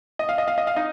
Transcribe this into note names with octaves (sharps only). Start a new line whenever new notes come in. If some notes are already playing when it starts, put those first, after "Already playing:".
D#5
F5
D#5
F5
D#5
F5
D#4 D#5